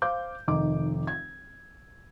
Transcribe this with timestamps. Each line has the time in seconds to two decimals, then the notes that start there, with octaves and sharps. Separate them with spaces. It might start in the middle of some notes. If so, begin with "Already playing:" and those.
0.02 C5 F5 D6 G6
0.48 F1 D#3 D6
1.07 G#6